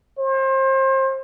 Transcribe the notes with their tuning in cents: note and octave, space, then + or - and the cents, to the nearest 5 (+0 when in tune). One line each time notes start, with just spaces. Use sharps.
C5 +30